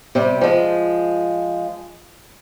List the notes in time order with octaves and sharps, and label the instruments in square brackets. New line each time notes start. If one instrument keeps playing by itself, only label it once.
[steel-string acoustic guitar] C3 G3
F3 G#3